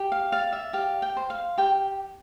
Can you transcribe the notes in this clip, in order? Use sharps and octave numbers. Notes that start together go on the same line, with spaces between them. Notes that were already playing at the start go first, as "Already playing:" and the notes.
Already playing: G4
F5
D5 F5
E5
G4 F5
G5
C5
F5
G4 G5